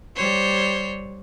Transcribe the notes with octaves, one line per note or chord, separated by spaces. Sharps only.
G3 C5 C#5